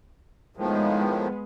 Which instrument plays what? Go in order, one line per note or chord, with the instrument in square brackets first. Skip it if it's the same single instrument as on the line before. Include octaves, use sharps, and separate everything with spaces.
[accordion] A2 D#3 F3 [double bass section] G#3 B3